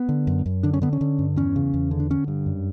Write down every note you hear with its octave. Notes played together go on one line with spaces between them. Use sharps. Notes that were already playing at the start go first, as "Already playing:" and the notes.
Already playing: B3
D3
F#2
F#2
D3 D4
C#4
D3 B3
C#4
D3
G2
E2 C#4
C#3
E2
D3
D4
D3 C#4
G2
F#2